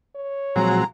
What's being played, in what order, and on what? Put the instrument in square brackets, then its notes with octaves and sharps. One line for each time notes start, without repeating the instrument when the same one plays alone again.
[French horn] C#5
[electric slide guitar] A#2 F3 F#4 [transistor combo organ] F#3 G#3 C4 [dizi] A#5